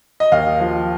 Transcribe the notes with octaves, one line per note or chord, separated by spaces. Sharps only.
D#5
D#2 F5
F3